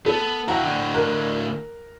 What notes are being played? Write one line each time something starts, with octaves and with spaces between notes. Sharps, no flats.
B3 A4
E4 F#4 F#5 G5 A#5
A2 D3
A#4 A#5 F#6